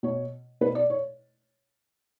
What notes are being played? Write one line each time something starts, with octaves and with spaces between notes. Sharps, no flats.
B2 C#5
B2 B4
D5
C#5